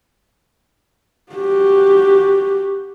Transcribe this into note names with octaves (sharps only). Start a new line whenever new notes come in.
F#4 G4